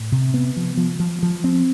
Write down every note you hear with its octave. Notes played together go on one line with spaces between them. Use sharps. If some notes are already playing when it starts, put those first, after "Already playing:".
Already playing: A2
C3
B3
F3
F3
F3
F3
C4